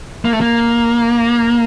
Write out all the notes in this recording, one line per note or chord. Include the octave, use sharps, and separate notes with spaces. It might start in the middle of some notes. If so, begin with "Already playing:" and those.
A#3
A3
A#3